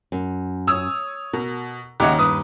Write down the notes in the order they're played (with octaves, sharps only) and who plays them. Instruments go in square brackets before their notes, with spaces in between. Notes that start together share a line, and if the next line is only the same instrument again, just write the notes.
[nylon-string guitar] F#2
[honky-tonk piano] C#5 D#6 [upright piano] E6
[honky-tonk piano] B2 [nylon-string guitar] A#4
[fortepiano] D#2 [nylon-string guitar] C#3 D#5 [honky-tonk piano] G4 C#5 F#5
[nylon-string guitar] G2 [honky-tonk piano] B4 [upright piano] D#6